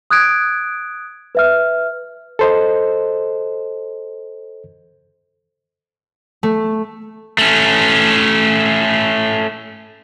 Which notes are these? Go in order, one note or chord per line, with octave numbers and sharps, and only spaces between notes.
D#6 F#6 G#6 D7
B4 E5 F6
A4 C5 D#5
A3
A3 C#4